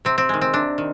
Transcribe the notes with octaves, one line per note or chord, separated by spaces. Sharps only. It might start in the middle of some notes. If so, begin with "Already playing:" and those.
C3 C4
C4
D#3 G#3
C4
C3 D4
D#3